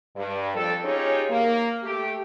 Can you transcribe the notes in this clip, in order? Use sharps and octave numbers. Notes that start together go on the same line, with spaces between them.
G2
F2 A4
C#4 D#4 F4 G4 G#4 C#5
A#3
A3 G4